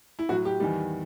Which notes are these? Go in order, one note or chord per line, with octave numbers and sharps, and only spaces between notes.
E4
A2 F#3 F#4
G4
E2 D#3 G3